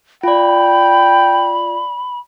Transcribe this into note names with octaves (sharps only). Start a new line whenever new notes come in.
F4 D5 G5 B5